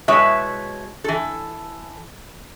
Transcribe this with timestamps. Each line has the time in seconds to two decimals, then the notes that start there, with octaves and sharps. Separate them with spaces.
0.08 B2 G#3 E4 B4 C#5 E5
1.04 E3 A4